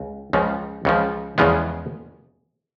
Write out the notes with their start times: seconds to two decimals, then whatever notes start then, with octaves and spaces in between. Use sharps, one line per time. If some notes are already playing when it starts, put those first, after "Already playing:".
Already playing: C#2
0.33 C#2 C#3 F3
0.85 C#2 C#3 F3
1.38 E2 C#3 F3 G#3 B3